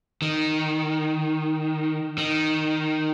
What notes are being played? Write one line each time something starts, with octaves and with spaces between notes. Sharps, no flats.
D#3
D#3